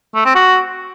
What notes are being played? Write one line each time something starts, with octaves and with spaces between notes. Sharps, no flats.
A3
C4
F#4